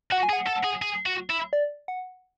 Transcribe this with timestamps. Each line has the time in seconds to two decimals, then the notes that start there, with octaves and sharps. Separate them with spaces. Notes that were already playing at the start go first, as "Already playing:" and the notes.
0.12 F#4 F#5
0.23 G#5
0.30 G#4
0.33 F#5
0.47 A4
0.64 G#4
0.82 G#4
1.06 F#4
1.30 E4
1.53 D5
1.88 F#5